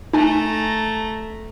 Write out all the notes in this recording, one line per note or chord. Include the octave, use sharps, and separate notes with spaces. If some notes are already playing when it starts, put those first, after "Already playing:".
A3 D#4 G#5 A#5